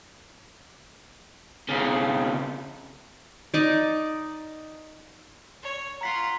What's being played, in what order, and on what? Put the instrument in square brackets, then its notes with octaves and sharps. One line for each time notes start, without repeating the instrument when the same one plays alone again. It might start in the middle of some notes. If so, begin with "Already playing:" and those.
[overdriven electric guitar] B1 C#3
[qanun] D#4 D5
[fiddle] C#5
[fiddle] F4 F#5 [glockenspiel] A#5 B6 C7